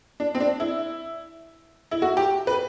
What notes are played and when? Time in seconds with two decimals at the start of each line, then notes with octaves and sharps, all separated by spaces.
0.20 D4
0.35 C4
0.40 D4
0.60 E4
1.91 E4
2.02 F#4
2.17 G4
2.47 B4